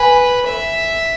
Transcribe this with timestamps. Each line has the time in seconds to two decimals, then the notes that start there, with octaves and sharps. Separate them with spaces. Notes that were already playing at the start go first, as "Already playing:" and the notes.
Already playing: B4 G#5
0.47 E5